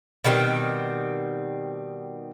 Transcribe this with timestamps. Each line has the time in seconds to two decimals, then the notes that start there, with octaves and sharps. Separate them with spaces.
0.24 B2 D#3 G3 C4